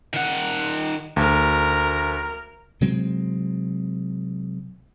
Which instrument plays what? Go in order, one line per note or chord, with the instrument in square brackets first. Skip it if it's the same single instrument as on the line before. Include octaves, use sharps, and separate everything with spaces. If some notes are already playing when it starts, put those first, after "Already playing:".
[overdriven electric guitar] D#3 F#5
[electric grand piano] D2 [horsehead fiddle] A#4
[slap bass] C3 F#3 G#3 C4